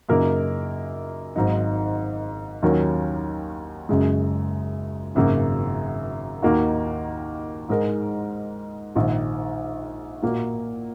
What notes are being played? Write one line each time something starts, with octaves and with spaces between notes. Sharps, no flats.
F#2 C#3 A#3 D#4 A#4
G#1 G#2 F#3 D#4
D#2 D#3 F#3 C#4 A#4
F#1 F#2 C#3 G#3
G#1 F#2 C#3 F#3 A#3
D#2 D#3 A#3 D#4 F#4
G#2 G#3 D#4 A#4
A#1 G#2 D#3
A#2 A#3 F#4 A#4